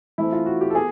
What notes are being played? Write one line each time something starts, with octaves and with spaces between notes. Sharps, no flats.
E3 A3 C4 E4
F4
F#4
G4
A4
B3 G#4